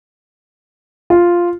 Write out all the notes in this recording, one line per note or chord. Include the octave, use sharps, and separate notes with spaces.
F4